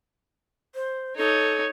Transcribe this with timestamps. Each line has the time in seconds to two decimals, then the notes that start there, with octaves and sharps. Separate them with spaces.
0.75 C5
1.17 D#4 A4 C#5